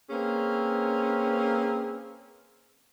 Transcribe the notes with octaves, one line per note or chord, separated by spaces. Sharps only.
A#3 C4 C#4 G#4 B4